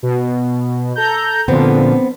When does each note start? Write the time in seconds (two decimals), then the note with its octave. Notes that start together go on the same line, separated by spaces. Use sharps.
0.03 B2
0.96 A4 A#5 G6
1.48 A#2 D3 F3 B3 C4